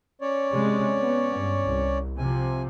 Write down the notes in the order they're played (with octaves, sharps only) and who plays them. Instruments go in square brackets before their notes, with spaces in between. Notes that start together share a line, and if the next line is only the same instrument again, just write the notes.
[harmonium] C#4 C#5 D5
[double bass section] C3 G#3
B3
G2
C2
[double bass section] C3 F3 [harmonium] G#5